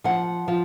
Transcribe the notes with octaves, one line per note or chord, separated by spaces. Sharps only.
F3 F#5
F3